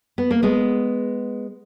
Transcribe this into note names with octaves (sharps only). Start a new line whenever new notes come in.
B3
A#3
G#3 B3